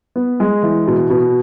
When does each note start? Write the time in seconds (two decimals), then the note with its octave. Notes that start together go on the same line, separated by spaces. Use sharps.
0.16 B3
0.40 G#3
0.63 E3
0.87 B2
1.10 B2